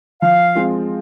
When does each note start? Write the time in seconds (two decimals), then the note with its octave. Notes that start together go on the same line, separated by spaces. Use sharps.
0.22 F3 F5
0.55 G#3 C4 F4